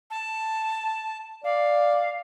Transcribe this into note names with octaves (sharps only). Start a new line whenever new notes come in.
A5
D5 F5